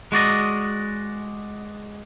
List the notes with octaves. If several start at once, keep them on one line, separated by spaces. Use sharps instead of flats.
G#3 F#4 D5 D#5